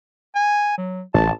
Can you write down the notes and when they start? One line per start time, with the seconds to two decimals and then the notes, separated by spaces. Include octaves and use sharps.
0.35 G#5
0.78 F#3
1.14 A1 A5